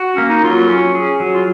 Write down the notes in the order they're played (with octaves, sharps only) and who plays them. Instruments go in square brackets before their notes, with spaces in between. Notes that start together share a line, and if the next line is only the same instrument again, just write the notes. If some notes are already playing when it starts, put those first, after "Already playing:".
Already playing: [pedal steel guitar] F#4
[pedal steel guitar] A#3 [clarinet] C#4
[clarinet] D#4
[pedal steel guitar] F#3 [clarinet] F4
[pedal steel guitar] C#4
G#4
F#3
[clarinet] F4